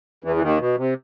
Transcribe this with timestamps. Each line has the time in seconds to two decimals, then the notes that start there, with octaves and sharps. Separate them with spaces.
0.24 E2 E3
0.36 E3
0.42 D#2 D#3
0.60 B2
0.78 C3